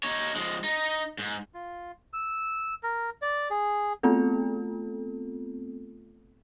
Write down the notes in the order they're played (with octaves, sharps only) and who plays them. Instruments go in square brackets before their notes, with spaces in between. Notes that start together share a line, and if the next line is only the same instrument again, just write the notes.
[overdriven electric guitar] D#4 C#5
F3 G#3
D#4
G#2
[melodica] F4
E6
A#4
D5
G#4
[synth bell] A3 B3 C4 F4 A4